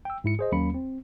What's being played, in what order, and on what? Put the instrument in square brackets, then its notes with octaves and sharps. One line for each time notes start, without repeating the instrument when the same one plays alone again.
[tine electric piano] G5 E6
G#2 E4 C#7
G#4 C5 D#5
D#2 F#3 A#3 C#4 B5 C#7
C4